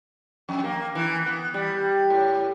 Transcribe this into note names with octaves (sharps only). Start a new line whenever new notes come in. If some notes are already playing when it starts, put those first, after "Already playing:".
F2
A#3
E3
B3
G3
A2